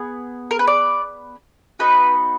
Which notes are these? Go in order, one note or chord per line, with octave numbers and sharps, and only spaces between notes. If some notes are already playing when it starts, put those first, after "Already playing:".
Already playing: B3 G#4
A#4
B4
D5
B3 D#4 F#4 B4